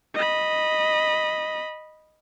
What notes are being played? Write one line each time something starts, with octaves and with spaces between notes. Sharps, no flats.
D#5 B5